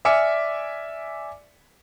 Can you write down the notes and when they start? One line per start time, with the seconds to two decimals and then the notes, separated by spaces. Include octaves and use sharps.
0.05 D5 E5 G#5 D6 F6 C#7